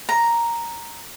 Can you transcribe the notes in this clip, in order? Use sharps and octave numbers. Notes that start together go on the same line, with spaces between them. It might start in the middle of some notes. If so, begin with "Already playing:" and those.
A#5